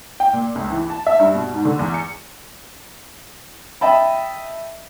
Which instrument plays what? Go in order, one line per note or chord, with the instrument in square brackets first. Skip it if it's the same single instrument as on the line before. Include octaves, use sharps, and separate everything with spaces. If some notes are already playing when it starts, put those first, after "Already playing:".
[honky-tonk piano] G5
A#2
C#2
E3
A5
E5
G2
B2
G#2
D3
E2
C#7
[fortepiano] D#5 E5 G5 A5 B5